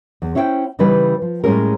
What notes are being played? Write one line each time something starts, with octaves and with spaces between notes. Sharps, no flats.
E2
C#4 E4 C5 F5 G5
C#3 E3 G3 D#4 B4
F3
A2 G3 G#3 C#4 G#4 A#4